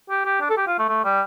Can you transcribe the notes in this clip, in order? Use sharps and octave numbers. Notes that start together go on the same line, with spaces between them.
G4
G4
D4
A4
G4
F4
A3
A3
G3